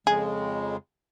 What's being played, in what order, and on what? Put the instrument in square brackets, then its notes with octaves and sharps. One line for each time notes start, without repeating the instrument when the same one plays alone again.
[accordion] F2 C#3 G#3 [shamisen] G#4